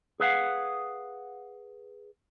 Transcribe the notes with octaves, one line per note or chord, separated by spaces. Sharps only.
G#4 B4 F5 F#5